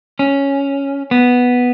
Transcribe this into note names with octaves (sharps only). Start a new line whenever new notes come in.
C#4
B3